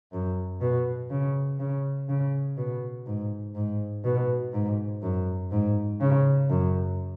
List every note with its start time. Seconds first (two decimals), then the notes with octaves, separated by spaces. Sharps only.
0.13 F#2
0.61 B2
1.10 C#3
1.59 C#3
2.09 C#3
2.57 B2
3.07 G#2
3.55 G#2
4.04 B2
4.53 G#2
5.02 F#2
5.52 G#2
6.01 C#3
6.50 F#2